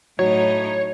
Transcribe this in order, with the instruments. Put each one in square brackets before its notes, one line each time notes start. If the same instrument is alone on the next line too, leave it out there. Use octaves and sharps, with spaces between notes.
[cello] A2 D#4 [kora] F#3 [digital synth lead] C#5